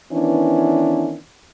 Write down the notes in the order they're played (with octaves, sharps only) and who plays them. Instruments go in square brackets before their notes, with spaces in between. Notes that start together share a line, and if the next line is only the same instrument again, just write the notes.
[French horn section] D#3 E3 B3 C#4 D4 E4